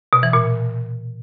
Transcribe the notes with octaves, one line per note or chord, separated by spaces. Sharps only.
B2
E3
A#2